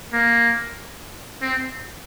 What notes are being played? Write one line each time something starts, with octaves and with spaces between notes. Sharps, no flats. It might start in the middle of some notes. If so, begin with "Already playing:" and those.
A#3
C4